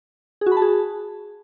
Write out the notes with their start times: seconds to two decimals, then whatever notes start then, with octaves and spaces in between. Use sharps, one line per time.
0.41 G#4
0.46 F#4
0.52 B5
0.57 A5
0.62 G#4